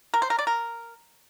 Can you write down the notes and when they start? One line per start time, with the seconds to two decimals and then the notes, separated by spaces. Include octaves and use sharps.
0.14 A#4
0.22 C5
0.30 A#4
0.39 D5
0.47 A#4